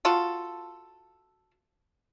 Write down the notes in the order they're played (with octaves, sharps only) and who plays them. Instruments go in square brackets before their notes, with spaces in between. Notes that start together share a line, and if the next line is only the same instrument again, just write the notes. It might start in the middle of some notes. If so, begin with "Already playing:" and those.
[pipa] F4 F#4 A4